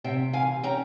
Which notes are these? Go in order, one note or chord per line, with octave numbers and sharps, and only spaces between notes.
C3 E5 G5
E3 F5 G#5
C#4 G5 A#5